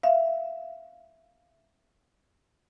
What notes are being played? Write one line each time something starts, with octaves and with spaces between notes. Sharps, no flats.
E5 F5